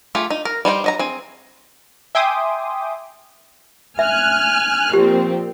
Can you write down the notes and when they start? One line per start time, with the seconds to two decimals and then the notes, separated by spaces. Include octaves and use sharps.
0.15 A3 F4 G4 G#4
0.30 D#4
0.45 A#4
0.65 G3 D#4 C5 G5
0.84 F#3 D#5 A#5
0.99 C4 G#4
2.15 E5 G5 G#5 C6 D6 D#6
3.99 E5 G#5 F6 F#6
4.93 A#2 F3 C4 G4